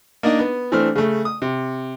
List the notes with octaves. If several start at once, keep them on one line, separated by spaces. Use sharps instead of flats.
A#3 D4 D#4 D#5
B3
E3 A3 C4 D4 F6
C#3 A3
D#6
C3